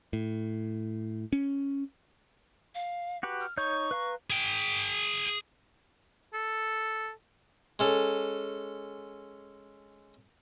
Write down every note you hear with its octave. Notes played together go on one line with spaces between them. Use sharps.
A2
C#4
F5
F#4 G4 B4
F6
D#4 C#5 C#6 G6
B4 F5 A#5
G#4 G5
A4
G#3 C#4 A4